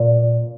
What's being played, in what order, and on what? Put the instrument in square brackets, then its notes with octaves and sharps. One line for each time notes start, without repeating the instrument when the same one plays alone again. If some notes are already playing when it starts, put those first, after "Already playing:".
Already playing: [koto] A#2